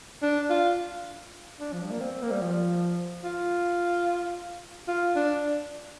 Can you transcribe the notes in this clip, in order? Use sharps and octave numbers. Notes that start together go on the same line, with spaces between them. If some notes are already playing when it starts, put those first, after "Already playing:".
D4
F4
D4
F3
G3
A#3
C4
A#3
G3
F3
F4
F4
D4